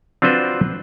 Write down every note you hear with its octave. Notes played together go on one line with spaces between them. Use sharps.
C4 D4 F4 F#4 B4 C5